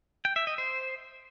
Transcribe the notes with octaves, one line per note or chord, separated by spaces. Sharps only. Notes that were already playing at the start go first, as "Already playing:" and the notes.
G5
E5
D#5
C5